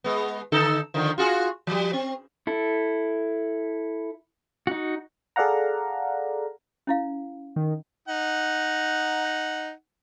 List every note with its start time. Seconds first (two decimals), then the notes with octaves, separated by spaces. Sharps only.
0.04 G#3 B3
0.52 D3 D#4 A4
0.94 D3 D#3 F3
1.18 F4 F#4 G#4
1.67 F3 G3
1.93 C4
2.47 E4 A4
4.67 D#4 F#4
5.36 G#4 A4 D5 F5 F#5 A#5
6.87 C#4 E4 F5
7.56 D#3
8.08 D#4 F#5